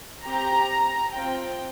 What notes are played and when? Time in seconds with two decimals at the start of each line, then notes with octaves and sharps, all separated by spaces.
0.24 C4 G4 A#5
1.13 C4 F4 G5